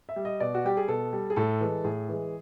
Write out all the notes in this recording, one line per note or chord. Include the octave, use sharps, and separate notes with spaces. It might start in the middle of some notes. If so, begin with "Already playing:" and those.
E5
G3
D#5
B2 D5
F#4
G3 G4
G#4
B2 A4
G3
G#4
A2 A4
E3 G#3
A2 G#4
E3 G#3